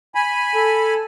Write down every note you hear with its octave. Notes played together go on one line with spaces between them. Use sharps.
G#5 B5
A4